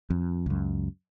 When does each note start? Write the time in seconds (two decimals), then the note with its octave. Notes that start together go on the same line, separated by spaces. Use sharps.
0.10 F2
0.46 C#2 F#2